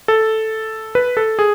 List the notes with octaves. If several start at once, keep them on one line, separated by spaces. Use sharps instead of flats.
A4
B4
A4
G#4